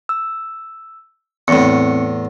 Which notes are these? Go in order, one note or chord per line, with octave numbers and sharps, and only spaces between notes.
E6
E2 A2 C4 C#6 C#7